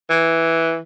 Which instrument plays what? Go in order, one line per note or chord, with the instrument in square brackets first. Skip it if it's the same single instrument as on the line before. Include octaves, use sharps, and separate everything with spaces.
[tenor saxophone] E3